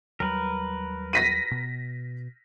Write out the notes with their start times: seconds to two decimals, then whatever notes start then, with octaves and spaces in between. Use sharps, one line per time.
0.20 D#2 F#3 G3 A#4 B4
1.13 A#6 B6 D#7
1.51 B2